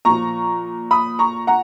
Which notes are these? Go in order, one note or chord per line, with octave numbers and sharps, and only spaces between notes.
A#2 F3 A#5 C#6
B5 D#6
A#5 C#6
F#5 A#5